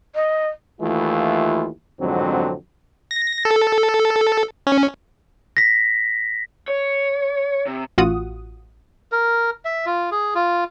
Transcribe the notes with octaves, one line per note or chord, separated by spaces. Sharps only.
D#5
D#2 E3 A3 E4 F4
A1 F2 G#2 D3 F#3 C4
A#6
A4
C#4
A#6 B6
C#5
C3
A1 F4 F#4 F#5 D#6
A#4
E5
F4
G#4
F4